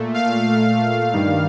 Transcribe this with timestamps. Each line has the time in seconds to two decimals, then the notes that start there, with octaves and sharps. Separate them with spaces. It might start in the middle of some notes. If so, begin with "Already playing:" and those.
Already playing: A#2 A3
0.14 F5
1.13 G2 D#3 G3